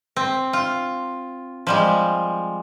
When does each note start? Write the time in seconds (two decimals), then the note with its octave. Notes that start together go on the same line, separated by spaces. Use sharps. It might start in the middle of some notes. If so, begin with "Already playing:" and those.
0.16 C4
0.53 F4
1.67 F3 G3 G#3